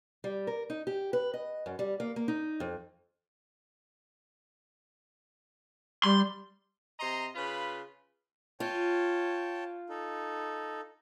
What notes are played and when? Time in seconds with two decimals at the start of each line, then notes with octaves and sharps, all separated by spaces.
0.24 G3
0.47 A#4
0.70 D#4
0.87 G4
1.13 B4
1.34 D#5
1.66 F#2
1.79 G3
2.00 A#3
2.16 A#3
2.28 D#4
2.60 F2
6.03 G3 C6
7.00 C3 D#5 A#5 C6
7.35 C#3 F4 B4 B5
8.60 F4 C#5 G5 A5
9.89 D#4 A4